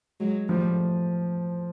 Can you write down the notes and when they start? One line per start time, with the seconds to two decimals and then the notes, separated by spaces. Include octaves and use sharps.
0.20 F#3 G#3
0.49 F3 G3 A3